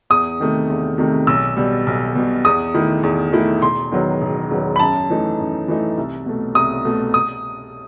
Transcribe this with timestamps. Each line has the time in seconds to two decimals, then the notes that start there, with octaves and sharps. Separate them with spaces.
0.10 E2 D#6
0.40 C3 D#3 A3
0.70 E2
0.98 C3 D#3 A3
1.27 B1 E6
1.57 B2 G3
1.87 B1
2.15 B2 G3
2.44 E2 D#6
2.74 D#3 A3 E4
3.03 E2
3.33 D#3 A3 E4
3.62 E1 C6
3.91 E2 D#3 F#3 B3
4.22 E1
4.51 E2 D#3 F#3 B3
4.76 B5
4.79 F#2 A5
5.10 E3 A3 D#4
5.39 F#2
5.68 E3 A3 D#4
5.97 C2
6.26 B2 A3
6.55 C2 D#6
6.85 B2 A3
7.14 D#6